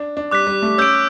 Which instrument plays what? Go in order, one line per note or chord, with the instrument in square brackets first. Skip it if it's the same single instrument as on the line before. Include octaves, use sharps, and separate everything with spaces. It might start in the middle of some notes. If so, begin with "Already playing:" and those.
Already playing: [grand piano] D4
D4
[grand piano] G3 [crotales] D6 F#6 B6
[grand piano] G3
A3
[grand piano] C#4 [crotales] E6 G6 D7